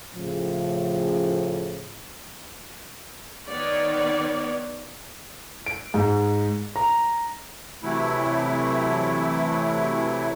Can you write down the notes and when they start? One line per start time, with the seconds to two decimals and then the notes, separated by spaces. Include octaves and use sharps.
0.15 A2 C#3 F3
3.48 D#3 B3 C#5 D5
5.66 D7
5.94 G#2
6.76 A#5
7.83 C3 E3 F#3 A3 E4